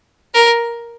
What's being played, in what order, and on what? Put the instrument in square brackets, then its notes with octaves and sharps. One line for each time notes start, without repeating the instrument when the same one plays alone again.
[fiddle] A#4